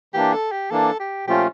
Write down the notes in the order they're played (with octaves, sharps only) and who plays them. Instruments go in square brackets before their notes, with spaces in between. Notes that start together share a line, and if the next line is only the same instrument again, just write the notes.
[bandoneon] E3 A#3 D4 [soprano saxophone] G4
[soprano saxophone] A4
G4
[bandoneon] E3 A#3 D4 [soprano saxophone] A4
[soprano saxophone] G4
[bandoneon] A#2 F3 A3 C#4 F4 [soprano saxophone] G4